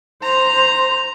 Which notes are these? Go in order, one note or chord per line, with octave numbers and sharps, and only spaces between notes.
C5 A#5